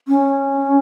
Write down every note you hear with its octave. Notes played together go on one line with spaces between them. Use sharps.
C#4